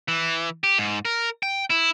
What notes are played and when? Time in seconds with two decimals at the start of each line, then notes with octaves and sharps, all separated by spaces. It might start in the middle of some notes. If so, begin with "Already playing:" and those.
0.08 E3
0.64 G4
0.78 G#2
1.05 A#4
1.43 G5
1.70 E4